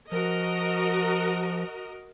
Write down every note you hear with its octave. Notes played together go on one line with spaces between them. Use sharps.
F3 F#4 A#4 D#5